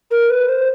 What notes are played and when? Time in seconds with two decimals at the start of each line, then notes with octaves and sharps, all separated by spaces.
0.11 A#4
0.30 B4
0.49 C5